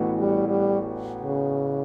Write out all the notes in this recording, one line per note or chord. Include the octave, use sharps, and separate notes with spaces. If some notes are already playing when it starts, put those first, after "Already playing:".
Already playing: A1 A2 E3 B3 F#4
G3
G3
C#3